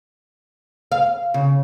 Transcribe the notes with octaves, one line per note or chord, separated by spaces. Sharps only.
F5
C#3